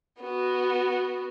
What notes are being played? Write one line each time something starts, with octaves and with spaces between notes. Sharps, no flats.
B3 F#4